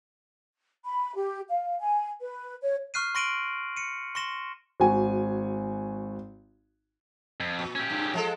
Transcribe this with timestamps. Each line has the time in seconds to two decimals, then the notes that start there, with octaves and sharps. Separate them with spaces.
0.85 B5
1.15 G4
1.50 F5
1.79 G#5
2.21 B4
2.62 C#5
2.94 C#6 F6 F#6 C7 D#7
3.15 C6 C#6 A#6 D7 D#7 F#7
3.76 C#7 D#7
4.15 C6 C#6 A#6 E7
4.80 G#1 F#4 G#5
7.40 F2
7.59 A#2
7.75 C#4 G4
7.90 G2 A#2
8.14 F3 G#3 A4